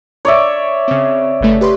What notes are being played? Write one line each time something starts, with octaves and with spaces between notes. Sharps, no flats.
C#5 D5 E5
C#3 C4
G1 C#3 A3
G4 B4 C6